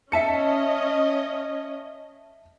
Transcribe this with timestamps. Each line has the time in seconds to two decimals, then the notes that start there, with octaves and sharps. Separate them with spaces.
0.12 C#4 D#5 E5 A5 C#7